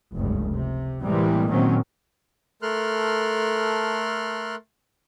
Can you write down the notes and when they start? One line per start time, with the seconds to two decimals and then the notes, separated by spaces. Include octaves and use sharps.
0.16 F1 C#2 G2
0.54 C3
1.02 A2 C3 E3 G3 G#3 A#3
1.49 A#2 D#3 F#3 A#3 C4 C#4
2.62 A3 A4 A#4 C6 F6 F#6